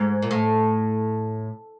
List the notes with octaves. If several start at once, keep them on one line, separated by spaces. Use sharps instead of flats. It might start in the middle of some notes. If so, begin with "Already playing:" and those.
Already playing: G#2
A#2
A2